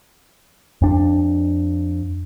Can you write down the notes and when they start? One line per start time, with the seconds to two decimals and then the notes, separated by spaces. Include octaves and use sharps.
0.82 F2 D4